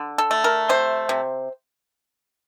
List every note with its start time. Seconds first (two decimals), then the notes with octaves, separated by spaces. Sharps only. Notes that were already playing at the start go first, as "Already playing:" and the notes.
Already playing: D3
0.18 A4
0.31 A3
0.44 A#4
0.69 C3 C5
1.09 C3